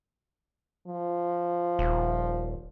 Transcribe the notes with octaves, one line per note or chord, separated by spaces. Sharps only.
F3
D#1